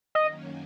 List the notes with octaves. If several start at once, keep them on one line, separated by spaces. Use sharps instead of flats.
F#2 D#3 F#3 A#3 C#4 D#5